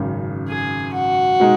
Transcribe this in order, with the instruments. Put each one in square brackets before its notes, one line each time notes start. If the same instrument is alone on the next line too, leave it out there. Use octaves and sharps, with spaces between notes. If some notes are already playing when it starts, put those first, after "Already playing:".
Already playing: [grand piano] G#1 F#2 C#3
[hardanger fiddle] G#4
F#4
[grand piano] B2 G#3 D#4